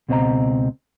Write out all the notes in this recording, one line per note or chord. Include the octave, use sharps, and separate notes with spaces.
C#2 B2 C4 C5 D#5 A#5